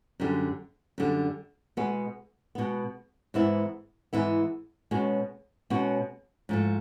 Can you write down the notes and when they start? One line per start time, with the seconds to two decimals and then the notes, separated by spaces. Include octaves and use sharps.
0.20 F#2 D3 G3
0.98 F#2 D3 G3
1.77 B2 G#3 B3
2.55 B2 G#3 B3
3.34 G#2 E3 G#3 B3 E4
4.13 G#2 E3 G#3 B3 E4
4.91 B2 G#3 C#4 F#4
5.70 B2 G#3 C#4 F#4
6.49 G#2 F3 A3